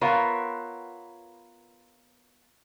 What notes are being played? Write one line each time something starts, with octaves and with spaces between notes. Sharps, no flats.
B3 F4 A#4 C#5 E5 F#5